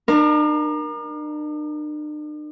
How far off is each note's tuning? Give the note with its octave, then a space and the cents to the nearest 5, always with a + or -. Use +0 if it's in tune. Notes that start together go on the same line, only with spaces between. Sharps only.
D4 +45 A#4 +15